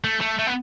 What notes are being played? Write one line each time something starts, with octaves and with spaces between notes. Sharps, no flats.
A3
A3
A3
B3